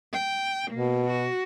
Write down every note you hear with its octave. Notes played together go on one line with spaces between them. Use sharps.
G5
B2 A#3
F#4